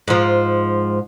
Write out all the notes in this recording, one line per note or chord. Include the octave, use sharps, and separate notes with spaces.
G#2 F3